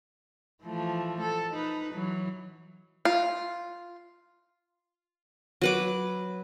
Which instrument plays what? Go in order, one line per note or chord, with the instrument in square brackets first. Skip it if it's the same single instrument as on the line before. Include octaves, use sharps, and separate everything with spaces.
[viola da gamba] E3 F3 A3
A4
D#4 B4
E3 F#3
[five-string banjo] F4
[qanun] F#3 B4 D6